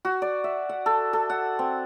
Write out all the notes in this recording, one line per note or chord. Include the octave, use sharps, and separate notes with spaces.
F#4
D5
E5
F#5
A4
A4
F#5
C4